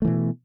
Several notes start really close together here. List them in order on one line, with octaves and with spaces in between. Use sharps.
A3 E3 B2